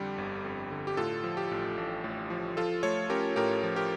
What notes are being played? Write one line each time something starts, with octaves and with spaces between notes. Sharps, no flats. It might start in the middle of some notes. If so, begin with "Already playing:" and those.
Already playing: F2 D3 G3 G4
G1
F2
D3
G4
A2 F4 A4
F3
G4
A1
A1
A2
F3
F3 F4 A4
A3 A4 C#5
C#4 G4 A#4
A2 G4 A#4
F3
G4 A#4